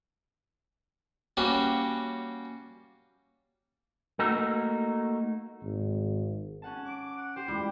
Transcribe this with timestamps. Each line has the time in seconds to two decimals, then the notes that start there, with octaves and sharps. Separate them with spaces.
1.37 G3 A#3 C#4 F#4 G4
4.19 A3 A#3 D#4 F#4 A#4
5.62 G#1
6.62 C#4 F#5 A5
6.85 D6
7.17 F#5
7.36 G4 C5
7.48 G3 G#3 E4 F4